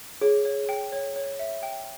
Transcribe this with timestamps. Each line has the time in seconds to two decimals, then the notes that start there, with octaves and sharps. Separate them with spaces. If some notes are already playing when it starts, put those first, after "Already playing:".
0.21 G#4 C#5
0.45 C#5
0.69 G5
0.92 C#5
1.16 C#5
1.39 E5
1.63 G5